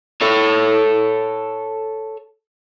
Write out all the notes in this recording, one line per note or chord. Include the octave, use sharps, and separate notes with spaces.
A4 C#5